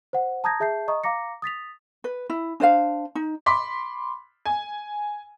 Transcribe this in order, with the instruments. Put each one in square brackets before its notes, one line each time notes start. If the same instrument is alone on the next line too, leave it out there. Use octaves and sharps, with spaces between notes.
[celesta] C5 F#5
A5 A#5 D#6 G6 G#6 A#6
G#4 E5 A5 G6 C7
D#5 A#5 C#6 D#6
F5 A#5 D6 A#6 C#7
D#6 A6 B6 F7
[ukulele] B4
E4
D4 C5 D5 F5
D#4
[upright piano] B5 C6 D6 B6
G#5